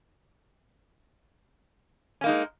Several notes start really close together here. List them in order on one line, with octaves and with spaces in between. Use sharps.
C#4 A#3 D#4 G#3